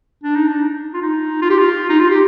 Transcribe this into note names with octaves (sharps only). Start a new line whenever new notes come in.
D4
D#4
D4
F4
D#4
F4
G4
F4
D#4
F4
G4